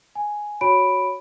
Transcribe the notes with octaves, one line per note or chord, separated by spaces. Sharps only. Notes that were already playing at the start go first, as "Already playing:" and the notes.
G#5
F#4 C#5 B5 D7